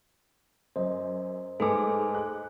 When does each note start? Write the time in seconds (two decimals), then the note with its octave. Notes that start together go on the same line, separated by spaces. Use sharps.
0.76 F#2 C5 D#5
1.60 G#2 A3 A4 B4 G#5 D6
2.15 F#6